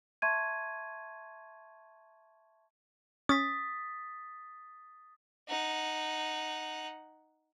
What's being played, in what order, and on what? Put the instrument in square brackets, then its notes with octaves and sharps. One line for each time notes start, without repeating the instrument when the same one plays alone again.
[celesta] E5 A5 C6 C#6 G#6 D#7
[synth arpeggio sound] C#4 [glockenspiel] D#6 A6 B6
[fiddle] D#4 F#5